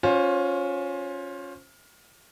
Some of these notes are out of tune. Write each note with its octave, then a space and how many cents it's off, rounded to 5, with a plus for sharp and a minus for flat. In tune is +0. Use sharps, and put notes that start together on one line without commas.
C#4 +0 F4 +25 C5 +20